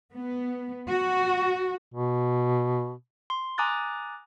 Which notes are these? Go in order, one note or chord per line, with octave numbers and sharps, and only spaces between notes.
B3
F#4
B2
C6
G#5 A#5 D6 D#6 F#6 A6